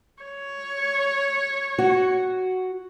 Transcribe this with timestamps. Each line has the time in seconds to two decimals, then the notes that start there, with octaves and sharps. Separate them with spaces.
0.23 C#5
1.79 F#4